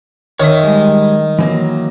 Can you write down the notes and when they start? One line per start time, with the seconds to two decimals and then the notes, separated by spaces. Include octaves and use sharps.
0.40 D#3 C#5 E5 D#6
0.63 G3 G#3
1.39 E3 F#3 A#3